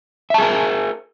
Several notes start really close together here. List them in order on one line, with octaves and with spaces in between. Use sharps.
E5 A5 G#4 A#4